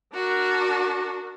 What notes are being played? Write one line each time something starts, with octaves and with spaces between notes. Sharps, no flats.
D4 F#4 A#4